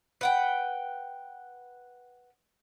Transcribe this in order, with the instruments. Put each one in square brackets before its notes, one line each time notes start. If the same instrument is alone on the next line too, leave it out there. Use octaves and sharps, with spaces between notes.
[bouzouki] B4 F#5 G5